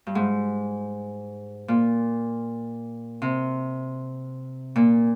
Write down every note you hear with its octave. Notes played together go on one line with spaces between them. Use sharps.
G2
G#2
A#2
C3
A#2